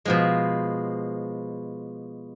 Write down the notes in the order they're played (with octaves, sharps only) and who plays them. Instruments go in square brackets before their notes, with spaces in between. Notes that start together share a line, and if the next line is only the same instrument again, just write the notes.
[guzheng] B2 F3 G#3